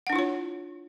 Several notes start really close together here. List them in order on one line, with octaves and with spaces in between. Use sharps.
F#5 D4 E4 F4 C#5